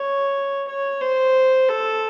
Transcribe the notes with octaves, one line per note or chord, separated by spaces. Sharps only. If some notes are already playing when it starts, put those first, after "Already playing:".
Already playing: C#5
C#5
C5
A4